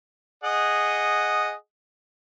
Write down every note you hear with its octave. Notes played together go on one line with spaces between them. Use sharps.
G#4 D#5 F#5